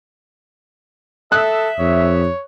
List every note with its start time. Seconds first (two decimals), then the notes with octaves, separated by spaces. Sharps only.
1.32 A4 E5 D#6 F#6
1.79 F2 C#5